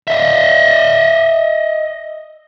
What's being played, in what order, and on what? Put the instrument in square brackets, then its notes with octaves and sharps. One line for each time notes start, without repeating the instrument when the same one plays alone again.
[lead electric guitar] D#5 E5